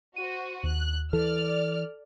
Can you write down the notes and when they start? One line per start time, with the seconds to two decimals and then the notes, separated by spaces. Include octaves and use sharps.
0.16 F#4 C5 D#7
0.63 D#2 F#6
1.13 E3 A4 D5 F6